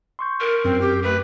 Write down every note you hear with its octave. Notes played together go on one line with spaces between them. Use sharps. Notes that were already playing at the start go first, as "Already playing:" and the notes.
C6 C#6 G6
A#4
F#2 C4
G4
A3 B4